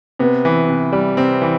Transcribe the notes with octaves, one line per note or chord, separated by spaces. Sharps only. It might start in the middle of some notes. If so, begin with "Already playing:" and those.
C3 B3
E3
C3
G3
C3 C4
E3